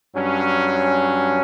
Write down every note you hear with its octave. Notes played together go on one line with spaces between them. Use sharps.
G2 F#3 C#4